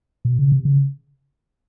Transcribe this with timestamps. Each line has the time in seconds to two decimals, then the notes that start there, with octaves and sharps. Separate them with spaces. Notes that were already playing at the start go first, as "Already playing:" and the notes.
0.25 B2
0.38 C#3
0.52 C3
0.65 C#3